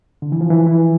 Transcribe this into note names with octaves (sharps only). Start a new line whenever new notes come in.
D3
E3
F3
E3
E3